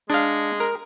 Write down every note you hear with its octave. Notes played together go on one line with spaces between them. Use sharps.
G#3 D4 F5
A#4